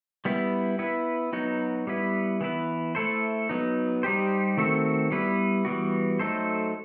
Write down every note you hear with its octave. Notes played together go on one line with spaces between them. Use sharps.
G3 B3 E4
B3 E4 B4
F#3 B3 D#4 F#4
G3 B3 E4 B4
E3 B3 E4 B4
A3 E4 A4 C5
F#3 B3 D#4
G3 D#4 G4 C5
D#3 A3 C4 F#4 A4
G3 B3 E4 B4
E3 G3 B3 F#4
F#3 A3 D#4 A4 C5